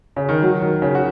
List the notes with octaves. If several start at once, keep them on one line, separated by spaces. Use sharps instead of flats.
C#3
D#3
F#3
D#3
C#3
F#4